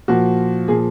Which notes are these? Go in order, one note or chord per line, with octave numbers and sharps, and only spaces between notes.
A#2 F3 F#4
A#2 F3 G#4